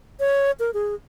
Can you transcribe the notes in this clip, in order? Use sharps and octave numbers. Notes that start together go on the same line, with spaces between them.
C#5
A#4
G#4